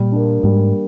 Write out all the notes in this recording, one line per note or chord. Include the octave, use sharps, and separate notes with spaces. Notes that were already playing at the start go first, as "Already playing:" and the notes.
Already playing: A#2 G3
A#3 D4
G#2 G3